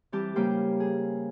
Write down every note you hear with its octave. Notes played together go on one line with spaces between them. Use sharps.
E3 G3 C4 G4 A5
C#3 G3 A#3 C5 G5
G#4